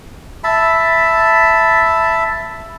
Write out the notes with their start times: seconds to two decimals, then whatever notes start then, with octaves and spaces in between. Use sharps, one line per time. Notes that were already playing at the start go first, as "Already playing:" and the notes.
0.44 E5 A5 B5